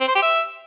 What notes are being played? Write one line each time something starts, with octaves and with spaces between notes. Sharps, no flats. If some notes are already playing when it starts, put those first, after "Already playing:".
C4
C5
G4
E5